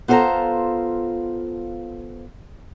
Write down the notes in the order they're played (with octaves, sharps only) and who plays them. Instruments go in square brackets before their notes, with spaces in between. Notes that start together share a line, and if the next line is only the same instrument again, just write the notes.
[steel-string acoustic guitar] B3 F4 A4 C5 F5 A#5